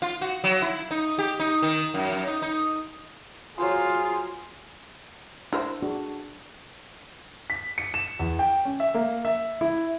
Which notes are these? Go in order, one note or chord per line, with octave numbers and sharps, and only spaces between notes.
F4
F#4
F#3
E4
D#4
G4
D#4
D#3
F#2
F#2
D#4
D#4
F#3 F4 G#4 C5 C6
D4 E4 A#4 C5 E6
D4 F#4 G#4
B6
C#7
E7
E2
G5
C#4
E5
A#3
E5
E4